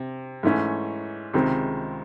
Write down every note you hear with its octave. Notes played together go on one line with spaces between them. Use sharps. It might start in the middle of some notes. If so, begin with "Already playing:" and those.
Already playing: C3
G#2 E3 A3 C#4
C#2 C3 D#3 G#3 C4